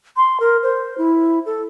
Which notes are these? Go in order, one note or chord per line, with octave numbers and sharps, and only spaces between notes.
C6
A#4
C5
E4
A4